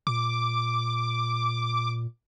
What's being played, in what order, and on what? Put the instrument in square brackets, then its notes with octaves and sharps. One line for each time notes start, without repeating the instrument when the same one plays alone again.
[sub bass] A#2 [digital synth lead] D6